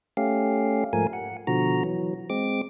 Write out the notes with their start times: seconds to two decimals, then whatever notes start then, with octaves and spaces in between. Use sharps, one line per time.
0.17 A3 C#4 G4 F5
0.93 G#2 F3 A3 A#4 G#5
1.13 F#5
1.47 B2 D3 F3 F#4 A#5
1.84 E3 F#3
2.30 G#3 C4 D6